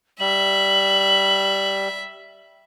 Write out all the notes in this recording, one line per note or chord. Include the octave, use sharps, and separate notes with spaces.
G3 E5 F#7